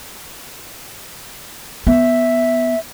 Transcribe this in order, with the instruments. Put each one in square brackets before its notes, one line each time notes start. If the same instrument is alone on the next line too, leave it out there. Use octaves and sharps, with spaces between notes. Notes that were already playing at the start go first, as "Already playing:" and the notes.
[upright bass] B3 [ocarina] E5